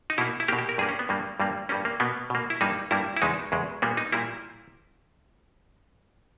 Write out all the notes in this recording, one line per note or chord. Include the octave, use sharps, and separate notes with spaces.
D#4
B2 A#3 E4
E4
B2 A#3 G4
G4
A#4
G2 G3 A#3 G#4
C#4
B3
G2 G3 A#3
G2 G3 A#3
G2 G3 A#3 C#4
A#3
B2 A#3 B3
B2 A#3
E4
G2 G3 A#3 D#4
G2 G3 A#3 E4
E4
E2 C#3 G#3 D#4
E2 C#3 G#3
A#2 G3 A#3 B3
D#4
A#2 G3 A#3 E4